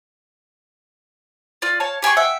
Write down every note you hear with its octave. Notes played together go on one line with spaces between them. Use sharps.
F4 D5
C#5 F5 A5
G4 G#4 G5 C#6
E5 F#5 G5